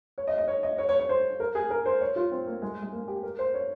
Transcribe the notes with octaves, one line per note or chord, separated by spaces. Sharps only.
C#5
D#5
D#5
C#5
D#5
C#5
C#5
C#5
C5
A#4
G#4
A#4
C5
C#5
F4
C4
A#3
G#3
G#3
A#3
G4
A#4
C5
C#5